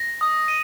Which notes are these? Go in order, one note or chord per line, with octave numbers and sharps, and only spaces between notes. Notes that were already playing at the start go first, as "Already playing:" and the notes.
Already playing: A#6
D#6
D#7